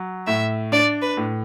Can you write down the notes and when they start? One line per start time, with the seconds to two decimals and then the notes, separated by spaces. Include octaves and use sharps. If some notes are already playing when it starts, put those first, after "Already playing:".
Already playing: F#3
0.27 A2 E5
0.72 D4 D5
1.02 B4
1.17 A2